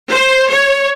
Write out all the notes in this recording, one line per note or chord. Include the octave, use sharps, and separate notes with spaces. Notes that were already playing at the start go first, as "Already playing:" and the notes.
C5
C#5